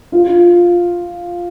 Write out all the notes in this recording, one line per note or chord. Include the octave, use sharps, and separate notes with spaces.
F4